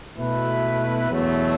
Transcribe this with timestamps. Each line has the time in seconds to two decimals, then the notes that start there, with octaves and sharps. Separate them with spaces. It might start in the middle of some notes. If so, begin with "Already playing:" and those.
0.16 B2 A3 E4 B4
1.10 E2 B2 F#3 A3